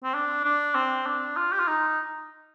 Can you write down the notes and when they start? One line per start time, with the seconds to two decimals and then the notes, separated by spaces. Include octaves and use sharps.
0.04 C4
0.14 D4
0.44 D4
0.75 C4
1.06 D4
1.37 F4
1.52 G4
1.60 F4
1.67 D#4